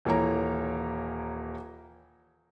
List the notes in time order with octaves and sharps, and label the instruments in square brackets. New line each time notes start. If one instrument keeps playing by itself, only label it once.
[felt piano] D#1 E3 A#3 C#5 A#5